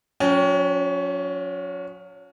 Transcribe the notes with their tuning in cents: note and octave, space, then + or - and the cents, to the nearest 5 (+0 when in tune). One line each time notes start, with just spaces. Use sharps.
F#3 -40 C#4 +20 G5 +0